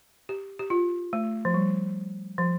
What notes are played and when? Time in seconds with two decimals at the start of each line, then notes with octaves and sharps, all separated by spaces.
0.29 G4
0.59 G4
0.70 F4
1.13 A3
1.45 F3
1.54 G3
2.38 F3